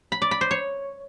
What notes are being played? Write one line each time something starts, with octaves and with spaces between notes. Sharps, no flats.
B5
D5
B5
C5
C#5